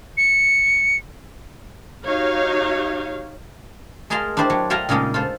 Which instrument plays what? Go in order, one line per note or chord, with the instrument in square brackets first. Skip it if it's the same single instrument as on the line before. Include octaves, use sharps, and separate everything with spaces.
[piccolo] C#7
[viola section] D#4 F#4 G4 C#5 F5
[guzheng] G#3 G#4 A#4 F5 A5 C6
D4 E4 G4 C5 D5 E5
F#3
A4 E5 F5 G5 G#5 A#5
A#2 C#3 G#3 A#3 D#4 A4
F4 A4 C5